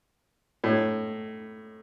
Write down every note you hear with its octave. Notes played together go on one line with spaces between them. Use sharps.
A2